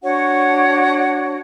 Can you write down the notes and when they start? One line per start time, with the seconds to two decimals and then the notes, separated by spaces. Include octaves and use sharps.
0.03 D4 F#4 C#5 F#5